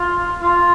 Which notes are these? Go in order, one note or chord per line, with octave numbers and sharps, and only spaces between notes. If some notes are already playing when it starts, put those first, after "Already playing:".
Already playing: F4
F4